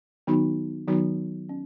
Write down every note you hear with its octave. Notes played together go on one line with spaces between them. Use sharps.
D#3 F#3 B3 D#4 F#4
D#3 F#3 B3 D#4 F#4
C#4